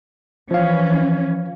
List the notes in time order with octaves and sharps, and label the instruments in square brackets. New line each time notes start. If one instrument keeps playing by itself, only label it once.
[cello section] E3 C#4 [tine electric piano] F3 F5